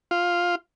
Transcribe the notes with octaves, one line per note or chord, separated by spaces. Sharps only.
F4